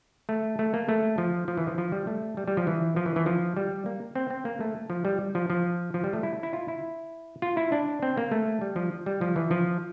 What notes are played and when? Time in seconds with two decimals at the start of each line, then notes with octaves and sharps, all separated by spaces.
0.29 A3
0.59 A3
0.74 A#3
0.89 A3
1.18 F3
1.48 F3
1.57 E3
1.67 F3
1.78 F3
1.92 G3
2.07 A3
2.37 G3
2.48 G3
2.57 F3
2.67 E3
2.96 F3
3.06 E3
3.16 E3
3.26 F3
3.57 G3
3.86 A#3
4.15 C4
4.30 C4
4.45 A#3
4.61 A3
4.90 F3
5.05 G3
5.35 F3
5.50 F3
5.94 F3
6.04 G3
6.13 A3
6.23 E4
6.43 E4
6.53 F4
6.68 E4
7.42 F4
7.57 E4
7.72 D4
8.02 C4
8.17 A#3
8.31 A3
8.61 G3
8.76 F3
9.06 G3
9.21 F3
9.36 E3
9.51 F3